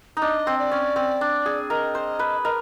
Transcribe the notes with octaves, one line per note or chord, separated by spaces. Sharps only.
D#4
D4 D#5
C4
D5
C#4
C4
D4
G#4
A#4 D#5
C5
B4
A#4 D#5